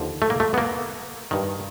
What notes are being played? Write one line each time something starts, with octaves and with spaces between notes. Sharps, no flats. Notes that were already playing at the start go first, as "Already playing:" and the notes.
Already playing: D#2 D3 F3
A3
A#3
A3
B3
A#3
G2 D#3